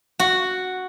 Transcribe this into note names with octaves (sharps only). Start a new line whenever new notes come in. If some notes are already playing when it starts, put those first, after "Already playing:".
F#4